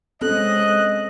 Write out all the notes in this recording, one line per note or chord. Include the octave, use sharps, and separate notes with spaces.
G#3 C4 C#4 A4 D#5 F#6